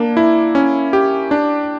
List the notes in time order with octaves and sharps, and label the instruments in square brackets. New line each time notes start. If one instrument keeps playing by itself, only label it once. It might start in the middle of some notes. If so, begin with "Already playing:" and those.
Already playing: [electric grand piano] A#3 D4
E4
C#4
G4
D4